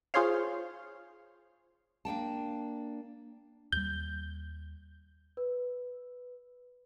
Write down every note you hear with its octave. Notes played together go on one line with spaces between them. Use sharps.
F4 G#4 C5 C#5 F5
A#3 D4 G5 A5
D#2 G3 G6
B4